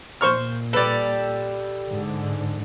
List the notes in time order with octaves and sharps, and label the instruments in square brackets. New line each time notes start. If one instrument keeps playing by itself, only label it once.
[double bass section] A#2 [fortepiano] C5 C#6 F6
[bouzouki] G3 A4 [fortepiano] B4 D5
[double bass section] G#2 D3